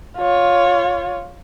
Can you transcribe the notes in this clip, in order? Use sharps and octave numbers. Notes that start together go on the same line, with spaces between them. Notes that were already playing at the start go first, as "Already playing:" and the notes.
F4 C#5